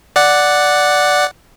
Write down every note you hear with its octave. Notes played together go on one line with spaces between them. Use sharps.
D5 F#5